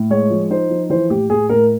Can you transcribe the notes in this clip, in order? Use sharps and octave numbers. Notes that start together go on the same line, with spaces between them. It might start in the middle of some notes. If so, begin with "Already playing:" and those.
Already playing: A2
G#3 C#5
F3
D#4 C5
F3
E3 C5
A2 G4
A2 G#4
A2 A#4